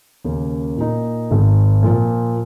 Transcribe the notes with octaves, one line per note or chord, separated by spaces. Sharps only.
D#2 C#3 A#3 C#4
A#2 A#3 D#4
G#1 G#2 D#3
A#2 F3 A#3 F4